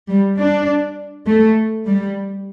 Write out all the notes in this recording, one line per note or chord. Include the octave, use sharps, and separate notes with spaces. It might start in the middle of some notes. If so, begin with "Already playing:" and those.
G3
D4
A3
G3